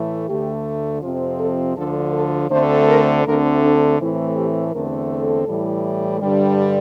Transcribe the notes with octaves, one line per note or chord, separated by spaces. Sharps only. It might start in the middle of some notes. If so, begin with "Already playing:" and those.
Already playing: A2 E3 A3
D2 D3 A3 G4
F2 C3 F3 C4 F4
A4
D2 D3 F3 A4
A4
D2 D3 A3 C4 C5
A#4
D2 D3 A3 C4 A#4
D4
A2 E3 A3 C4 E4
G4
E2 D3 A3 C4 A#4
A4
A2 E3 G3
G2 D3 G3